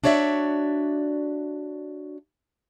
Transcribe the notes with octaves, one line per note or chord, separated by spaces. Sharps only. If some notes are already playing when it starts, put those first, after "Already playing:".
D4 F#4 C#5 D5 E5